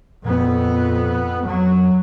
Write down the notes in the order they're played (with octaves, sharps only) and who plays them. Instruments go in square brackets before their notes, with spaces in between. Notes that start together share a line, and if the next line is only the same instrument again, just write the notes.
[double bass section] F2 B3 [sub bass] A#2
[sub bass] F2 [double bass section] F#3